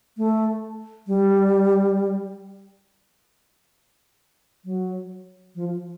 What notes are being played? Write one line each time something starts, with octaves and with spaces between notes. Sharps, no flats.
A3
G3
F#3
F3